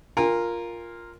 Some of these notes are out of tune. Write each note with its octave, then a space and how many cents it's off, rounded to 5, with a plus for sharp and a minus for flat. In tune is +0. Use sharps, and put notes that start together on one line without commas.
F4 +0 A#4 +0 G#5 -30